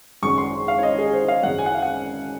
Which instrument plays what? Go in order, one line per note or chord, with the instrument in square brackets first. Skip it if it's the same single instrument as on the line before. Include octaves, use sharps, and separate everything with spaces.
[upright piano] G#1 F#2 C#3 C#6
C6
F5
C#5
D#5
G#4
C5
F5
G#1 F#2 C#3 G#3 F#5
G#5
F#5
F5
F#5